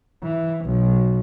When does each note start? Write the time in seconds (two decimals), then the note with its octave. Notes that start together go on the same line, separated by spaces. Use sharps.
0.23 E3
0.65 B1